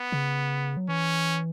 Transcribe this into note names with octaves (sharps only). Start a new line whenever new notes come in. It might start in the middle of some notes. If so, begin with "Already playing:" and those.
Already playing: B3
C#3
F#3
E3 C#4